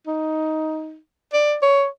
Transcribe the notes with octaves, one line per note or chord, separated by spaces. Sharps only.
D#4
D5
C#5